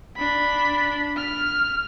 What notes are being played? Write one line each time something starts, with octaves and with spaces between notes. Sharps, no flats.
D4 B5
F6